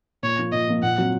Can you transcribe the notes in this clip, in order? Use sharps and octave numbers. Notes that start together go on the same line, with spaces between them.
A#2 C#5
F3 A#3
A#2 D#5
F3 A#3
A#2 F#5
F#3 C4 F4